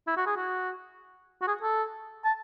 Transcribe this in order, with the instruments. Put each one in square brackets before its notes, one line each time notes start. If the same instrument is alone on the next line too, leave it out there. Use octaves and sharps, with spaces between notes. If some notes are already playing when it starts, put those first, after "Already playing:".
[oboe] E4
F#4
G#4
F#4
F#4
G#4
A4
A5